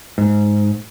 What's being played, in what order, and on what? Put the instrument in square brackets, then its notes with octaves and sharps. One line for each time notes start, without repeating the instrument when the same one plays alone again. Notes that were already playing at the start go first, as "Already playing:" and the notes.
[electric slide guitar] G#2